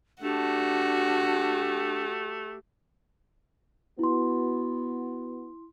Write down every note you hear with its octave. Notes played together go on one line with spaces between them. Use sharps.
A3 D4 F#4 G4
B3 E4 F#4 C6